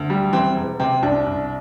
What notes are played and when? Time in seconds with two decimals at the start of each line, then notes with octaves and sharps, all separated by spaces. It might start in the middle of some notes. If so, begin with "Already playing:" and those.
Already playing: D2
0.10 G3
0.33 E3 C4
0.56 E1
0.80 C3 C4
1.03 C2 D4
1.26 C2